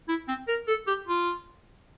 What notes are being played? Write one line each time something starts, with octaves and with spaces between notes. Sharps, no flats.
E4
C4
A#4
A4
G4
F4